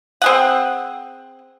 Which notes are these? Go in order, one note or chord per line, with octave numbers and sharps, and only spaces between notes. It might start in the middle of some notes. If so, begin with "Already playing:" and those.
C4 G#4 F#5